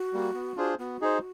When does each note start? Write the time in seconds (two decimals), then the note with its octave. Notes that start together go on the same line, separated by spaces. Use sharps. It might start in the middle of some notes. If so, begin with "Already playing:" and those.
Already playing: F#4
0.13 G3 A#3
0.35 B3
0.57 D4 F4 G#4 C5
0.79 B3 F#4
1.01 D#4 G#4 C5